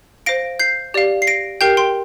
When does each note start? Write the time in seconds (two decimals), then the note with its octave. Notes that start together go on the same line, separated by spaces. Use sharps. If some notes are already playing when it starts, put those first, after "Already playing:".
0.26 C5 F5 A#6 D7
0.59 G6 C7
0.94 G4 D5 F5
1.22 C7
1.27 A#6 D7
1.61 G4 A#4 G5 G6 C7
1.77 G5 C6